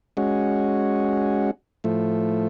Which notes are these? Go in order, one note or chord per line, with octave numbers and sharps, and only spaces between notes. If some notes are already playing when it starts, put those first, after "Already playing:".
G#3 C#4 F#4
A2 F3 A3